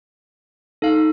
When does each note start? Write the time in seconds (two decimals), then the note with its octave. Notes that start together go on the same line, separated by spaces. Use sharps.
0.82 D#4 A4 F5